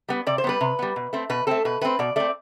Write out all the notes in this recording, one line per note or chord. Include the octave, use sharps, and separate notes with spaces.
G3 B3
C3 D5
C5
G3 B3 B4
C3
G3 B3
B2
A3 C4
B2 B4
A3 C4 A4
B2 B4
A3 C4 B4
B2 D5
A3 C4 D5